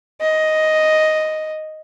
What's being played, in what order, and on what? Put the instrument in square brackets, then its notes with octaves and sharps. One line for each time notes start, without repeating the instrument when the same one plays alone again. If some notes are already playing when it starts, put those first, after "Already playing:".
[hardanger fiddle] D#5